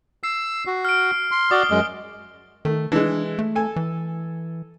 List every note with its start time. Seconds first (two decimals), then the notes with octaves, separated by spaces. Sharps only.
0.23 E6 C7
0.67 F#4
0.85 F6 D7
1.31 C6
1.51 F#4 D5 D#6 G7
1.70 F#2 G#3
2.65 D#3 A3
2.92 E3 G#3 D4
3.39 A3
3.55 A4 G#5
3.76 E3